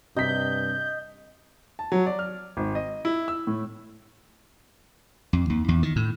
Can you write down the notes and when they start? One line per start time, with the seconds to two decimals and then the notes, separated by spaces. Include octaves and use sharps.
0.16 G2 C3 D#5 G6 B6
1.79 A5
1.92 F#3
2.06 D5
2.19 F6
2.57 G#1
2.75 D#5
3.05 E4
3.28 E6
3.47 A2
5.33 F2
5.50 D#2
5.68 E2
5.83 D#3
5.96 A2